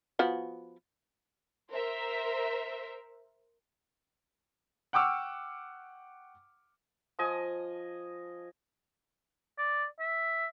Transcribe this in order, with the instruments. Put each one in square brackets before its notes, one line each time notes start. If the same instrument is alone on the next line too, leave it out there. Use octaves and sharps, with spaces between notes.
[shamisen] F3 B3 F#4
[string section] A#4 C5 E5
[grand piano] F#5 G5 C#6 D6 E6 F6
[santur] F3 D#5 G#5
[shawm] D5
E5